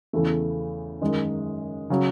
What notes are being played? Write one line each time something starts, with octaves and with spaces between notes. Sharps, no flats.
E2 C#3 E3 A3
F#2 D#3 G#3
C#3 F#3